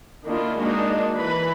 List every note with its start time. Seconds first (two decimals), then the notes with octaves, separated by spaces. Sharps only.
0.25 D#3 A#3 D4 E4 F4
0.57 G#3 A#3 D4 D#4 F#4
1.18 E3 B4 B5